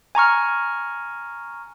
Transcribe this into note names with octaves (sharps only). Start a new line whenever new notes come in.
G#5 A#5 C#6 F6